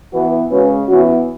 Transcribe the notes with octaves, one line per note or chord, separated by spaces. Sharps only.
E3 B3 F#4 B4
C#3 G#3 C#4 F#4 B4
E3 B3 C#4 F#4